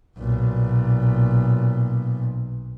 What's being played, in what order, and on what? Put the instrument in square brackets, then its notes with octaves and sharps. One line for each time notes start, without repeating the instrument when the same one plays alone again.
[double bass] B1 A#2